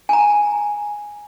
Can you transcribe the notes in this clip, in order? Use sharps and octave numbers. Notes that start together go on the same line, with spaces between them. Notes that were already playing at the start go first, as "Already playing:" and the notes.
G#5 A#5